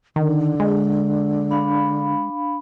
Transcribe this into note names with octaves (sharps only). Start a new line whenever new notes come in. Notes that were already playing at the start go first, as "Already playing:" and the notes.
D3 D#3
G#3
D4 F5 B5